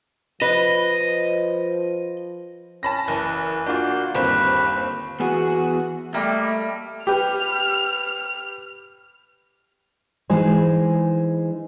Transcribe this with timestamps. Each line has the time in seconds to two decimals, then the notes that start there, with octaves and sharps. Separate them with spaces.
0.41 F3 B4 D#5
2.83 C#4 A5 B5 A#6
3.08 F#1 E3
3.66 A#3 D4 F4 F#4 G6
4.15 G1 D#2 C4 B4
5.20 E2 B3 F#4 G#4
6.14 G3 A3 A#3 D#5 E5
7.07 G4 B4 F6
10.30 E3 G#3 D#4 G#4 C5